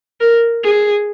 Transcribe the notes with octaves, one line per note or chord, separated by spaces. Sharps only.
A#4
G#4